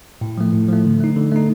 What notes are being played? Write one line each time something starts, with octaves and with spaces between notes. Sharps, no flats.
A2
F3 A3
A2
F3 A3
D3
A3 D#4
D3
A3 D#4